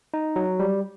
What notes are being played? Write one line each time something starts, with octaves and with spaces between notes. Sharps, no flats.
D#4
F#3
G3